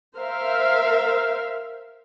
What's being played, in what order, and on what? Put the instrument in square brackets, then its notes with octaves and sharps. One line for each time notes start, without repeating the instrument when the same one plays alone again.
[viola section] A#4 C5 E5 F5